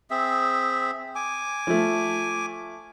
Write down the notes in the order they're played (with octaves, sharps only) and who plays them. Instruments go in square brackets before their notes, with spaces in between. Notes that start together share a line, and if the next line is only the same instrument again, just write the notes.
[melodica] C4 G#4 E5
G#5 D6
[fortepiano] F3 A3